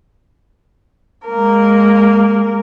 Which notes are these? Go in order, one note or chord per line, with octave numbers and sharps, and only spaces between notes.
G#3 A#3 A#4